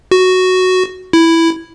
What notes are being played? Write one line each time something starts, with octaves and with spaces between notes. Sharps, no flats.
F#4
E4